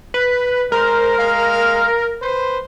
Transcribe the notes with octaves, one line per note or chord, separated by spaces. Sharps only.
B4
G#3 A#4 C5
G#3 F5
B4 C5